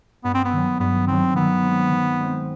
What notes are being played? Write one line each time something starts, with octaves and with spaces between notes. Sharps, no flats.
G2 B3
C4
B3
D#3 F#3
G2 B3
D#3 F#3 C4
D#3 B3
G#3 C4
D#3
G#3 C4